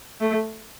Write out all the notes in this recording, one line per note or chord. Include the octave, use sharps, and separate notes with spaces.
A3